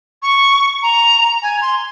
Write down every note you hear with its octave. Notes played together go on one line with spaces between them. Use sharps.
C#6
A#5
G#5
C6